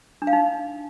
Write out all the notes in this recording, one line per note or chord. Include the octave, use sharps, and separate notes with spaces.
D4
F5
D#4